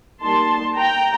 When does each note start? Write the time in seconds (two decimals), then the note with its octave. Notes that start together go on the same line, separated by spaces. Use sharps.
0.22 G3 A#3 D#4 A5 C6
0.77 G5 A#5